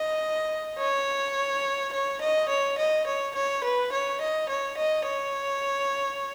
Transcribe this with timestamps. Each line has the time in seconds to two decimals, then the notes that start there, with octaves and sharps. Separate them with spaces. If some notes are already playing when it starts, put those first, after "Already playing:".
Already playing: D#5
0.78 C#5
1.92 C#5
2.21 D#5
2.49 C#5
2.78 D#5
3.06 C#5
3.35 C#5
3.63 B4
3.92 C#5
4.21 D#5
4.49 C#5
4.77 D#5
5.06 C#5